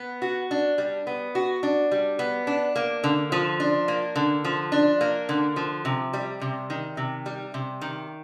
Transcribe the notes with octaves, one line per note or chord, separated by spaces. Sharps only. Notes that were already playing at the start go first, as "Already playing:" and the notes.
Already playing: B3
F#4
D4
G3
B3
F#4
D4
G3
B3
D4
A#3
D3
F3
D4
A#3
D3
F3
D4
A#3
D3
F3
C3
G3
C3
D#3
C3
G3
C3
D#3